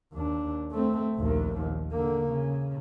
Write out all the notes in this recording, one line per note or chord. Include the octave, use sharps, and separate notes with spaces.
D#2 D4
A3 C4
A#1 D#2
D3 A#3
C#3